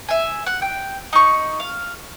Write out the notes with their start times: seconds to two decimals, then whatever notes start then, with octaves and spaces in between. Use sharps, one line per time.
0.09 E5 G#5
0.47 F#5
0.62 G5
1.13 D#4 C#6
1.60 F5